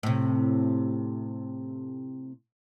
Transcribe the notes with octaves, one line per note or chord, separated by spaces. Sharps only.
A2 C3